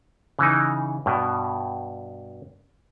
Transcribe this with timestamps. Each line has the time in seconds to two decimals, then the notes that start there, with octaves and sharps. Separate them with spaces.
0.39 C#3 E3 D#4
1.06 G2 B2